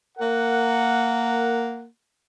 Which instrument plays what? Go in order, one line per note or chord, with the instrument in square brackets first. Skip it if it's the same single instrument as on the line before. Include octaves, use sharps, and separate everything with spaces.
[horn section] A#3 A#4 F#5